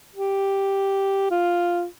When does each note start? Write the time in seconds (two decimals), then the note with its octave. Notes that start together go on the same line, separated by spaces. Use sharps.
0.15 G4
1.31 F4